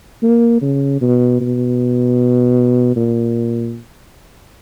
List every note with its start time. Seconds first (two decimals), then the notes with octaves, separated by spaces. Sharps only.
0.23 A#3
0.62 C#3
1.02 B2
1.41 B2
2.96 A#2